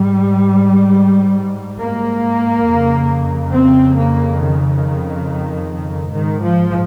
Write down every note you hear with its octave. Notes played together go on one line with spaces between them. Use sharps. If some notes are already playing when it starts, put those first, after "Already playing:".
Already playing: G#2 G3
A#3
F2 C#3
C4
A#3
D#3
G#2 D#3
F3